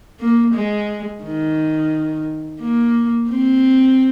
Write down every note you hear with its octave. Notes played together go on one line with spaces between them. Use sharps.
A#3
G#3
D#3
A#3
C4